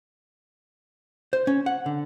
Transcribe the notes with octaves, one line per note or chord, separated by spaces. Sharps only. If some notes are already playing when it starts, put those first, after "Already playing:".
C5
C#4
F#5
D3